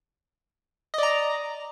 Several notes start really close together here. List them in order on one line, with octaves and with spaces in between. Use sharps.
D#5 D5 A#5